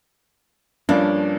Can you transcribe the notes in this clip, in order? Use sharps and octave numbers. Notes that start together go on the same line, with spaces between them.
G2 F3 A#3 C#4 D4